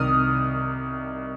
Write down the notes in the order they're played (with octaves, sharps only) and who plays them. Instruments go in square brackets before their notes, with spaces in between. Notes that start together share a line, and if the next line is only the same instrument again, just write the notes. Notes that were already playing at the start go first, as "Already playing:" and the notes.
Already playing: [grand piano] C2 C3 D#3 D#6 F6